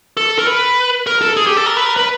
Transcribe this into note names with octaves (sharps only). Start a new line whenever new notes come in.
A4
A#4
B4
A#4
A4
G#4
G4
A4
A#4
B4
A#4
B4